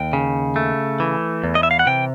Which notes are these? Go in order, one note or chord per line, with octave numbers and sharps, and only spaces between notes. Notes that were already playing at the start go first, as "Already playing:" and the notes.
Already playing: D#2 G5
C#3
A3
E3
E2
D#5
E5
F5
F#5
C3 G5